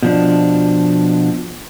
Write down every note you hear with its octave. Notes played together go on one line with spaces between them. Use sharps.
B2 F3 D4